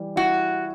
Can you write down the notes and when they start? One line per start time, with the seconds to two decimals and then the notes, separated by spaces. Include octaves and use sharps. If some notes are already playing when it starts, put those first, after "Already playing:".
Already playing: E3 G3
0.16 E4 F#4